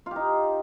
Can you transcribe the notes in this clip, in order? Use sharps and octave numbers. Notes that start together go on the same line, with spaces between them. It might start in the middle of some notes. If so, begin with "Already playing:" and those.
D#4 F4 G4